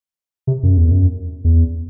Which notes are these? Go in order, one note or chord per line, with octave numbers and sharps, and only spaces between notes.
C3
F#2
E2
F#2
E2